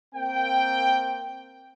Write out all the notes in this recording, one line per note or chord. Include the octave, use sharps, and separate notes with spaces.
A#3 C4 G5